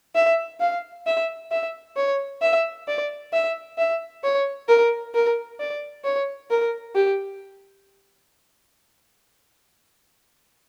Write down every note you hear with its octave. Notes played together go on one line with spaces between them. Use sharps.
E5
F5
E5
E5
C#5
E5
D5
E5
E5
C#5
A#4
A#4
D5
C#5
A#4
G4